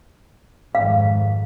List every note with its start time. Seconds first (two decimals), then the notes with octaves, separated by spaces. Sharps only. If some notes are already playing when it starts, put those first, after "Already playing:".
0.75 G#1 F2 G#2 F5